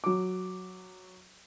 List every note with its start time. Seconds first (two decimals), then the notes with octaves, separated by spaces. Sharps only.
0.04 F#3 D6